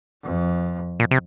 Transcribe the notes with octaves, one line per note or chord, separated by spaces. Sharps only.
F2
A#2
C3